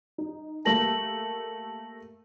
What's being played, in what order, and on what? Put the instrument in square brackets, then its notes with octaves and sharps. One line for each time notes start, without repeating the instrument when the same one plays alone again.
[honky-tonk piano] D#4
[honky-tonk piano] A3 A#3 G4 [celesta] A5 A#6 F#7